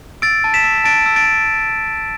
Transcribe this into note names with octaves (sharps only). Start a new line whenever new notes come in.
E6 A6 D7
A5
B6 E7
E6
A5 A6 D7
E6
A6 D7
A5